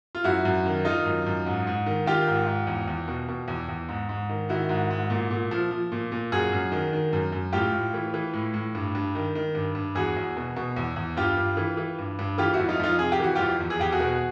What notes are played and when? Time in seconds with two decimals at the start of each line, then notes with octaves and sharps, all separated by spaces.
0.15 F4
0.24 F#2 E4 F#4
0.45 F#2
0.66 D#3
0.85 D#3 D#4 F4
1.05 F#2
1.26 F#2
1.46 G#2
1.67 G#2
1.86 D#3
2.06 D#3 F4 G4
2.27 G#2
2.47 G#2
2.67 E2
2.87 E2
3.08 B2
3.28 B2
3.48 E2
3.69 E2
3.89 G#2
4.09 G#2
4.29 D#3
4.49 D#3 E4 F#4
4.69 G#2
4.91 G#2
5.10 A#2
5.30 A#2
5.51 F3
5.71 F3
5.92 A#2
6.12 A#2
6.32 F#2 F#4 G#4
6.52 F#2
6.72 D#3
6.93 D#3
7.13 F#2
7.32 F#2
7.53 A2 F4 G4
7.73 A2
7.94 E3
8.14 E3
8.33 A2
8.54 A2
8.75 G2
8.95 G2
9.15 D#3
9.35 D#3
9.55 G2
9.75 G2
9.95 E2 F#4 G#4
10.17 E2
10.37 B2
10.56 B2
10.76 E2
10.96 E2
11.17 G2 F4 G4
11.37 G2
11.57 E3
11.77 E3
11.99 G2
12.19 G2
12.38 E3 F4 G4
12.53 E4 F#4
12.59 F2
12.69 D#4 F4
12.80 F2 D#4 F4
12.99 C3 G#4
13.12 G4
13.20 E3 F#4
13.35 F2 F4 G4
13.60 E2
13.70 G#4
13.80 E2 G4
13.92 F#4 G#4
14.00 B2